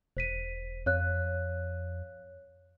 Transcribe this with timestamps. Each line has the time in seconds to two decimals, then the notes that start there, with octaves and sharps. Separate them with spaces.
0.17 E1 C5 B6 D#7
0.86 F2 C#5 F5 F#6